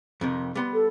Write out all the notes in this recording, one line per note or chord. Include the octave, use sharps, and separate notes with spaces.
F2 C3 D#3
G3 B3 C6
A4